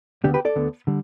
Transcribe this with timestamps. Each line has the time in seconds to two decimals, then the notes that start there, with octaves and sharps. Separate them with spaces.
0.24 D2 D3 B3 D4 G4
0.34 G4 B4
0.45 A4 D5
0.56 D2 D3 B3
0.87 D3 G3